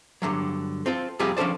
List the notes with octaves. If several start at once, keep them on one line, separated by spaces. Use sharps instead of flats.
G2 D3 F3 F#3
C4 F4 A4
F2 C3 G3 F4 G4 G#4
F3 C#4 D4 A4 C5 D5